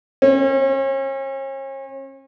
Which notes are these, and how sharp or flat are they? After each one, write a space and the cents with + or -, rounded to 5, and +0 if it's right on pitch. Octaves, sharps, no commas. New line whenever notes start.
C#4 -40